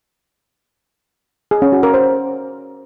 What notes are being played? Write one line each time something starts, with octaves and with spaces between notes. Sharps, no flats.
G#4
C#4
F#4
A#4
C5